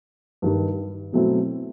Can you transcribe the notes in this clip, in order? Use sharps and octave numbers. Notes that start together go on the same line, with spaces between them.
G2 D#3 G3
B2 F#3 A3 C4 E4